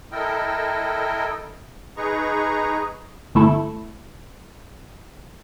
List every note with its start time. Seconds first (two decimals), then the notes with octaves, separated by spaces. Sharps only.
0.12 E4 A4 A#4 D#5 G5
1.97 D#4 G#4 B4 A#5 C#6
3.35 G1 A3 E4 A4